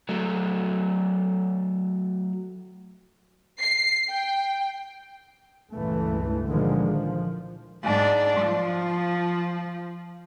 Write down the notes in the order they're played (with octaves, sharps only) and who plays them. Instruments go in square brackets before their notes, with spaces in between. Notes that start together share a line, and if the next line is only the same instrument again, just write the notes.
[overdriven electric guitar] F#3 A3
[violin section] C7
G5
[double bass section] C#2 G2 A#2 E3 A3
A#2 D3 D#3 F3 G#3
F3
[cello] G#2 D4
F3